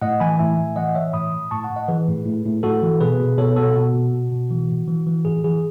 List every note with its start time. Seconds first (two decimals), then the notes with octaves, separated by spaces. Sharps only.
0.02 A2 D#5 F#5
0.20 E3 G#5 B5
0.39 A2 E5 G#5
0.57 A2
0.76 E3 D#5 F#5
0.95 E3 C#5 E5
1.13 A2 B5 D#6
1.33 A2
1.51 A2 A5 C#6
1.63 F#5 A5
1.70 A2
1.76 D#5 F#5
1.88 E3 G#4 B4
2.08 A2
2.26 A2
2.45 A2
2.63 A2 F#4 A4
2.83 E3
3.01 B2 G#4 B4
3.20 B2
3.38 B2 A4 C#5
3.56 B2 F#4 A4
3.76 B2 F#4
3.95 B2
4.13 B2
4.32 B2
4.51 E3
4.69 A2
4.88 E3
5.07 E3
5.25 A2 G#4
5.44 E3 G#4